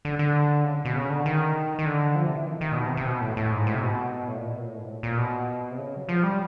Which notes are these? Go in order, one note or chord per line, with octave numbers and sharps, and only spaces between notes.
D3
D3
C#3
B2
C#3
D3
D#3
D#3
D3
F3
C3
E3
D#3
D#3
A#2
B2
C3
C3
B2
A2
A2
G#2
A2
C3
B2
A2
A#2
B2
A#2
A2
G#2
A2
A#2
B2
C3
C#3
F#3
F3
G3